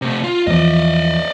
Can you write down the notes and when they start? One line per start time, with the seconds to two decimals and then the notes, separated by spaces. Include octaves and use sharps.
0.02 C3 A3
0.24 F4
0.47 E2 E3 F3 D5 D#5